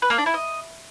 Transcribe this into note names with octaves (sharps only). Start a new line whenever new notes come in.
B4
A#3
D4
E4
D#5